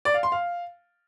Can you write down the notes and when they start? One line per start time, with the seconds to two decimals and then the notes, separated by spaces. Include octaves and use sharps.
0.05 D5
0.14 F5
0.23 C6
0.32 F5